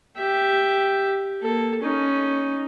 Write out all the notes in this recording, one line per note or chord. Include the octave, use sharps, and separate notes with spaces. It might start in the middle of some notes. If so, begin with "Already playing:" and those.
G4 E5
A#3 A4
C#4 D#4